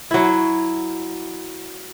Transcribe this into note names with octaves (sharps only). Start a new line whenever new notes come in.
F#3 E4